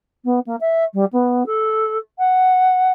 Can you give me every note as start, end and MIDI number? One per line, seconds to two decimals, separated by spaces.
0.25 0.39 59
0.46 0.56 58
0.61 0.84 76
0.94 1.05 55
1.12 1.43 59
1.46 1.98 69
2.19 2.92 78